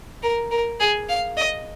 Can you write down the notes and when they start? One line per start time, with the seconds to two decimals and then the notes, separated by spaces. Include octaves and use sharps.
0.23 A#4
0.51 A#4
0.80 G#4
1.09 F5
1.37 D#5